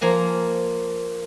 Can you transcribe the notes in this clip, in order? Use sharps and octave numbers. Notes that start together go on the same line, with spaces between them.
F3 A#3 G#5 A#5